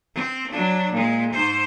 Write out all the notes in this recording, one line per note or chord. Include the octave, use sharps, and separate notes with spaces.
C4
F#3 D4
A#2 G#3
G#2 C5